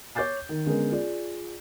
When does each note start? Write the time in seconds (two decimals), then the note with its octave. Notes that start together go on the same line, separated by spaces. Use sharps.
0.15 C#5 D6 G6 A6 C7
0.49 D#3
0.66 D3 G#3 B3 C#4 A#4
0.92 F4 G#4 D5